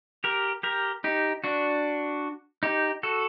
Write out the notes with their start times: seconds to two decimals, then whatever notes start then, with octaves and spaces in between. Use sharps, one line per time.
0.24 G4 A#4
0.63 G4 A#4
1.04 D#4 G4
1.44 D4 F#4
2.63 D#4 G4
3.03 F#4 A4